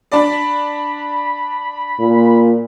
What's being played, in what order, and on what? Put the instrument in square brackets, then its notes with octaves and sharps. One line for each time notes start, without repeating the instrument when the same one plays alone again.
[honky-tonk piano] D4 D5 [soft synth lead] B5
[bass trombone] A#2